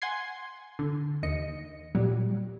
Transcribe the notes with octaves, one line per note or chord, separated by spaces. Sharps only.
F#5 G#5 C6 G#6 C7
D3
D#2 D#5 C#7
A#2 F#3 G3